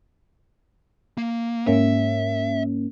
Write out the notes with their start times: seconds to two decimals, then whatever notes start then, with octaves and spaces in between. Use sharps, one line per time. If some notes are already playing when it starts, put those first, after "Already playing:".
1.18 A#3
1.67 G#2 A#3 C#4 E5